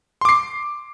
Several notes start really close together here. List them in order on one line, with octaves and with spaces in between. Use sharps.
C6 D6 C7